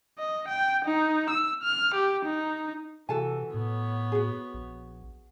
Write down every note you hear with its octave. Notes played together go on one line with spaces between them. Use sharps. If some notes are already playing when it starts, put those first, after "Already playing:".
D#5
G5
D#4
E6
F6
G4
D#4
C3 E3 F#4 A4 G#5
A2 B3 C#5
F#4 G#4
A#1